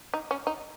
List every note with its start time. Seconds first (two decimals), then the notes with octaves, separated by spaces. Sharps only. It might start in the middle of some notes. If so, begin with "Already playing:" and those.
0.14 D#4
0.31 C#4
0.47 D#4